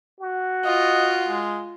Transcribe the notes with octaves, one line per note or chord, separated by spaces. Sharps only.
F#4
F4 D#5
G#3